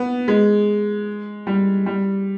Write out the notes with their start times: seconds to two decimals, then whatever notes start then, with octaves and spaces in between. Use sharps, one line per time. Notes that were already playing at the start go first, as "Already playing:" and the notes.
Already playing: B3
0.28 G#3
1.47 G3
1.86 G3